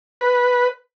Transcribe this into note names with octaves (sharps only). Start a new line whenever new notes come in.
B4